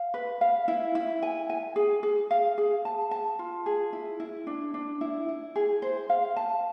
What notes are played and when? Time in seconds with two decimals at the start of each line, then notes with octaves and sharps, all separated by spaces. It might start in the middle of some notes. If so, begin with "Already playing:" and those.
Already playing: F5
0.14 B4
0.41 F5
0.68 E4
0.95 E4
1.23 G#5
1.50 G#5
1.76 G#4
2.03 G#4
2.31 F5
2.58 G#4
2.85 A5
3.11 A5
3.39 F4
3.66 G#4
3.93 E4
4.20 E4
4.47 D4
4.74 D4
5.01 E4
5.29 E4
5.56 G#4
5.82 C5
6.10 F5
6.37 A5